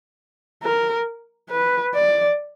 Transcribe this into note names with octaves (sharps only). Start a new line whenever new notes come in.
A#4
B4
D5